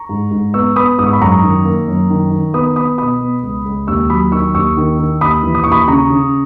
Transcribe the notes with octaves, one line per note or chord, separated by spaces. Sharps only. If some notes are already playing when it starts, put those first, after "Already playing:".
Already playing: A#5 C#6
G#2
G#2
B3 C#6 E6
B3 B5 D#6
G#2 D#6
C#6
B5
F#2 A#5 C#6
D#3
A#3
F#2
D#3
D#3
B3 B5 D#6
B3 B5 D#6
B2 B5 D#6
B3
C#2
C#2
D#2 C#6 E6
F#3 B5 D#6
D#3 C#6 E6
D#2 C#6 E6
D#3
D#3
D#2 B5 D#6
E3
D#6
D#2 C#6
B5 D#6
C#3 A#5 C#6
C#3